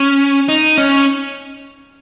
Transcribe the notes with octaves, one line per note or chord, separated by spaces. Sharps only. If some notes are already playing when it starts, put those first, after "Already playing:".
Already playing: C#4
D#4
C#4